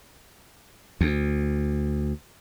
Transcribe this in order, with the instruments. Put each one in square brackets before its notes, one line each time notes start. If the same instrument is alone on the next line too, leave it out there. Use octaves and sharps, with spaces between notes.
[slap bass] D2